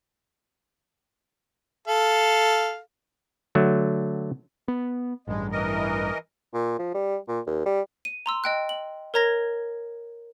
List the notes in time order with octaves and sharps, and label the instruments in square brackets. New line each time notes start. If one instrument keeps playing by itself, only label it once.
[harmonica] A4 F5
[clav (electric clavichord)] D3 F#3 A3
[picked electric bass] B3
[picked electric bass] A1 G2 [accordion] G#3
[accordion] E3 A#4 D#5
[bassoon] A#2
F3
G3
A#2
D#2
G3
[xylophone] D#7
A#5 C6 E6
D#5 G5 F#6
F#7
A#4 C#5 A#5 G#6 A#6